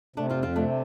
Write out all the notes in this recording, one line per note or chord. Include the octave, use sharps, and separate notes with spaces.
C3 A3 D4
C4 F4
F2
C4 F4
C3 A3 D4